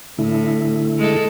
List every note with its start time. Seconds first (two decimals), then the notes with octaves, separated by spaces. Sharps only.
0.18 A2 D3 A3 E4
0.98 G#3 A4